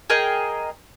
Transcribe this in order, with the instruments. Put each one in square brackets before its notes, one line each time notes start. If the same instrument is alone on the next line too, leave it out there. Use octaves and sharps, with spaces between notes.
[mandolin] G#4 A#4 D#5 G5